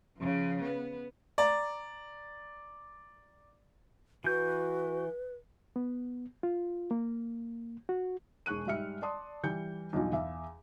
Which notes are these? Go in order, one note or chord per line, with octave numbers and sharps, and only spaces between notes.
C#3 F3
B3
D5 A#5
E3 F#4 B4 G6
B3
F4
A#3
F#4
E1 G#4 C#6 F#6 D#7
G#2 G3 E5 F6 C#7
D5 A5 C6 D#6
E3 G3 G6 C#7
B1 E2 G2 B2 F4 G#5
E2 E5 F5